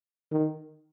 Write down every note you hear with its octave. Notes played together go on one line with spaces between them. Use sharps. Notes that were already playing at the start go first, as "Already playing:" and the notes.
D#3